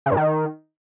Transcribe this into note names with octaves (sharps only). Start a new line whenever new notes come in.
C#3
G2
D#3